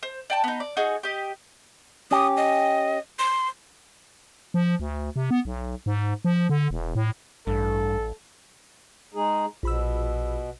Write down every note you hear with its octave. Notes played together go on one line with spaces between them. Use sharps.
C5
D5 G5 A5
B3 D#4
D5
D#4 F#4 G#4
G4 D#5
C#4 G4 D#6
D#5
C6
F3
D2
C3
B3
B1
G#2
F3
D3
E1
A2
A1 G2 A4
G#3 D#4 G#4
A#1 B2 B5 E6